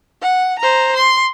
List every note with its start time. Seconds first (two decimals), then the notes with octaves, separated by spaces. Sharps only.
0.22 F#5
0.59 C5 A#5
0.97 C6